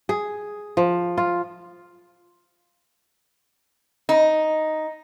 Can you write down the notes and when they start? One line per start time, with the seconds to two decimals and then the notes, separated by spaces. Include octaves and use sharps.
0.09 G#4
0.77 F3
1.18 F4
4.09 D#4